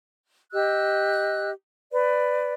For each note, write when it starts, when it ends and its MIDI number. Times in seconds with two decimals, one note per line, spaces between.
0.53 1.51 67
0.53 1.51 75
0.53 1.51 88
0.53 1.51 90
1.92 2.53 71
1.92 2.53 74